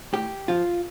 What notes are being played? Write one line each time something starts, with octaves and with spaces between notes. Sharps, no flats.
A2 G4
F3 F4